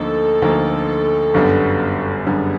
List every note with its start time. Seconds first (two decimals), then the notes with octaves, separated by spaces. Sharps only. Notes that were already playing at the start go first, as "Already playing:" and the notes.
Already playing: D2 D3 F3 A#3 D#4 A4
0.42 D2 D3 F3 A#3 D#4
1.34 G1 F#2 D3 G3 B3
2.26 G1 F#2 D3 G3 B3 G#4